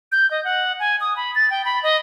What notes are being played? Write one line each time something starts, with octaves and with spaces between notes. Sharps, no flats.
G6
D#5
F#5
G#5
D#6
B5
A6
G5
B5
D#5